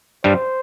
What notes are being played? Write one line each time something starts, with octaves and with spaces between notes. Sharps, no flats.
G2 G3 C5